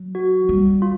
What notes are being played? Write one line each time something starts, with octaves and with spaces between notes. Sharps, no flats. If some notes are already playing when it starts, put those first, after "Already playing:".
Already playing: F#3
F#4
G3
F4